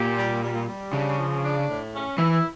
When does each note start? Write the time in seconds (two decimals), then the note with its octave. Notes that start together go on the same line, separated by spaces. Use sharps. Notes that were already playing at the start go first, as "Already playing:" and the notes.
Already playing: A#2 G4
0.17 G3
0.43 G3
0.67 G3
0.93 C#3 D4
1.17 F3
1.44 D4
1.68 A2
1.94 C#4
2.18 E3 E4